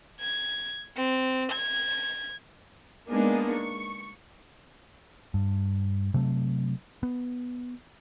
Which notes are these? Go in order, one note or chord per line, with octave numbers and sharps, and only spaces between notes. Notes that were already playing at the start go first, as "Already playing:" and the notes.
G#6
C4
G#6
G#3 A#3 B3 D4 D#4 G#4
C#6
G2
C3 F#3 A3
B3